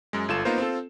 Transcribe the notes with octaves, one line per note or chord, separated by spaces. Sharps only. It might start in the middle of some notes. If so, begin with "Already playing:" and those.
F#2 G#3
G1 F4 A4 E7
A#3 B3 D#4 F4 A#4 C5
C4 F4 A4